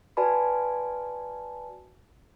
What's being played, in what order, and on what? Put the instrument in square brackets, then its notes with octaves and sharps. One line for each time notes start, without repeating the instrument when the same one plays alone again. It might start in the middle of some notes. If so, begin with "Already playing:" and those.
[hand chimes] F#4 B4 D5 G#5 A5 B5